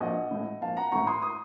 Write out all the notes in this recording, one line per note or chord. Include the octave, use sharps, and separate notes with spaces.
A#1 D#5 F#5
A2 A3
A#1 F5 A5
F#5 A#5
A2 A3 A#5 C#6
C6 D#6
C6 D#6